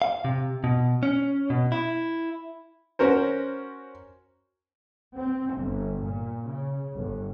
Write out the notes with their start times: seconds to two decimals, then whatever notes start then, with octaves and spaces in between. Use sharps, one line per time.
0.02 F5
0.25 C3
0.64 B2
1.03 C#4
1.50 B2
1.72 E4
2.99 C#4 F#4 A#4 C5
5.18 C4
5.56 G1
6.05 A#2
6.49 C#3
6.94 G1